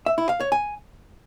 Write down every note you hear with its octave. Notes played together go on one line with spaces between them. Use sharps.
E5
E4
F5
C#5
G#5